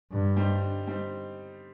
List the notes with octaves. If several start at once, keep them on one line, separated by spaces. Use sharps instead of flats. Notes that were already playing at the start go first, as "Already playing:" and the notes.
G2 D3
G3 C4 D#4
D3
G3 C4 D#4